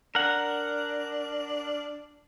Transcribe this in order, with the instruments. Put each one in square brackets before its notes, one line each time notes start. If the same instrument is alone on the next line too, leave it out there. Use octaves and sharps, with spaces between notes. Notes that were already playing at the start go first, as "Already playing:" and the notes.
[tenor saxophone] D4 [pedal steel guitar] A#4 F#5